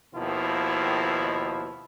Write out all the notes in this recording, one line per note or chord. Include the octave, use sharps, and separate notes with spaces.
D#2 B2 D#3 F3 E4